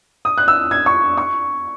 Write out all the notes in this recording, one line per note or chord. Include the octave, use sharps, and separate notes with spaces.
D#6
F#6
E6
G#6
C#6
C#6